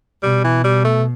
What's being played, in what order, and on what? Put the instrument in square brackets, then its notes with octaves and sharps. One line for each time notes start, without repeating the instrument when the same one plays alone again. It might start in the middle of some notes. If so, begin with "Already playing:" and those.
[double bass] B2 [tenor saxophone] G3
[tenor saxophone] E3
G3
A3